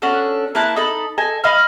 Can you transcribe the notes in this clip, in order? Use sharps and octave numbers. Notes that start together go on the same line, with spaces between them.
C#4 D4 F#4 A4
A#3 E4 A5 F#6
D#4 A4 B5
A4 D#5 G#5 A5
D#5 F5 B5 F6